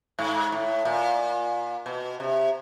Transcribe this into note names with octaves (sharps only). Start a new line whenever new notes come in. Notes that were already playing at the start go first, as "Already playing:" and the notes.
G#2
A2
A#2
B2
C3